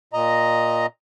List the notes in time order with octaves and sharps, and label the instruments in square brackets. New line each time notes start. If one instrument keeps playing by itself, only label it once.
[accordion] A#2 D#5 A#5